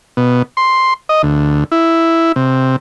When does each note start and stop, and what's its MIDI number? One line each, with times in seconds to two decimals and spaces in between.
0.17 0.42 47
0.57 0.94 84
1.09 1.22 75
1.23 1.64 38
1.72 2.32 64
2.36 2.76 48